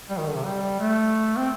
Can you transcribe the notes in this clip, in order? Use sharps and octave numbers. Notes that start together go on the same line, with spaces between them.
G3
D#3
D3
C3
G3
A3
C4